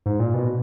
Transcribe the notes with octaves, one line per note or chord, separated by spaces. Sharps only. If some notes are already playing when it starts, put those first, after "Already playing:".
G#2
A#2
B2